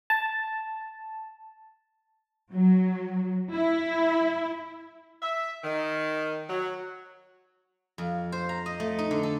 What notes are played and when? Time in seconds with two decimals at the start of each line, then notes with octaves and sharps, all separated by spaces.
0.10 A5
2.51 F#3
3.54 E4
5.22 E5
5.64 D#3
6.50 F#3
7.98 F2
8.32 C5
8.49 A#5
8.66 D#5
8.80 A3
8.98 D#4
9.11 D3
9.23 A4